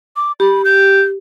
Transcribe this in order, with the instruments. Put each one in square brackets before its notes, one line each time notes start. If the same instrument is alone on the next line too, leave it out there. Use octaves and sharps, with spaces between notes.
[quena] D6
[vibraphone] G4 [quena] B5
[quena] G6